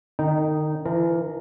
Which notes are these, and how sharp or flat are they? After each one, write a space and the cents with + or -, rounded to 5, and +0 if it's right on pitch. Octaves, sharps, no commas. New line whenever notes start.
D#3 -35 D#4 -5 G5 -10
E3 +35 A#4 +0 A5 +45